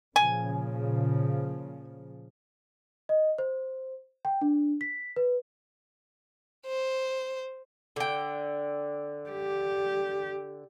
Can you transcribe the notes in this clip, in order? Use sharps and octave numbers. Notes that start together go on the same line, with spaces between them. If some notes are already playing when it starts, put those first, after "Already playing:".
A#2 C#3 F3 G#5
D#5
C5
G5
D4
B6
B4
C5
D3 G5
G4